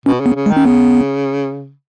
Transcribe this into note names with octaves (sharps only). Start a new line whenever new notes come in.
B2 C#4
C#3
B3
C#3
G#3
D#3
C#4
C#3 B3